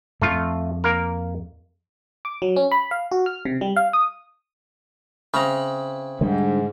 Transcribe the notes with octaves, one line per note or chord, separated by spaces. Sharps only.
F2 A3 F4
A#3 A#4
D6
F#3
C#4
B5
F5
F#4
F6
C3
G3
F5
D#6
C#3 C4 E4 B4 A#5
G#2 D3 G3